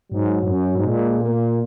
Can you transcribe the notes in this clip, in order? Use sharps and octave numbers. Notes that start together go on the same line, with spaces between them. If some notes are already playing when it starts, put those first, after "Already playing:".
G#2 F#3
G#2
F#2
G#2
A#2 G#3
A#3